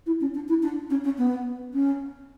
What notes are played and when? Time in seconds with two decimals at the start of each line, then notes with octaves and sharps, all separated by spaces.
0.06 E4
0.21 C#4
0.34 D4
0.48 E4
0.63 D4
0.90 C#4
1.04 C#4
1.18 B3
1.74 C#4